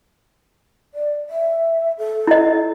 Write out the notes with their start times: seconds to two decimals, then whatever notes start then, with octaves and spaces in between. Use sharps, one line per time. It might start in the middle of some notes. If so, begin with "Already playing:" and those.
0.94 D5
1.30 E5
1.98 A4
2.27 E4 D#5